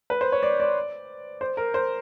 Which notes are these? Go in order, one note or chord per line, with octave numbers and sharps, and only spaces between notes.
B4
C5
C#5
D5
D5
C5
A#4
C5